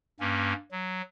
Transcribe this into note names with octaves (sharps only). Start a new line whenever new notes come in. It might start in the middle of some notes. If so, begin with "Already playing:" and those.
G2 A#3 C#4
F#3